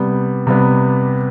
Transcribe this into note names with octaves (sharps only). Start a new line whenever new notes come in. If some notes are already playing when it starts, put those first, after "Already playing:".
Already playing: C3 G3 B3
C3 G3 B3